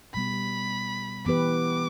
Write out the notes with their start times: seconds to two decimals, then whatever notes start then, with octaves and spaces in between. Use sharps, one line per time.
0.14 B2 G3 B3 B5
1.26 E3 B3 G4 B4 D6